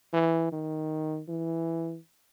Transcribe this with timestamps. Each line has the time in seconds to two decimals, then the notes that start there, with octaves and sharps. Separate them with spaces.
0.14 E3
0.52 D#3
1.28 E3